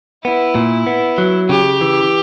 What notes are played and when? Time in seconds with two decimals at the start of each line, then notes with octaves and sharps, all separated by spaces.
0.25 B3 E4
0.55 A#2
0.87 B3
1.18 F#3
1.49 C#3 G4
1.81 E3